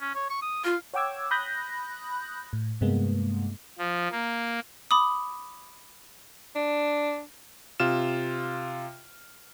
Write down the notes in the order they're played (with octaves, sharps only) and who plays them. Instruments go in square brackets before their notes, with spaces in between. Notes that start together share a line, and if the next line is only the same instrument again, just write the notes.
[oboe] C#4
C#5
C#6
D#6
[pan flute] F4 [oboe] F5
[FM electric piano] C#5 F#5 G5 D6 E6 G#6
B5 D#6 F#6 G6 A#6
A2
G2 C3 G#3 A#3 B3
[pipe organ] F3
A#3
[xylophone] B5 D6 D#6
[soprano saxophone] D4
[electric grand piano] C3 F4 F6 E7